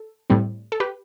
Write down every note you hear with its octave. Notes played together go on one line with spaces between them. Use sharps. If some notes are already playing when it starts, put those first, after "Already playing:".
Already playing: A4
A2 G3 C4
A4
G4 B4